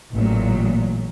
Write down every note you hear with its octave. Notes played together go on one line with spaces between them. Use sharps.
A1 A#2 F#3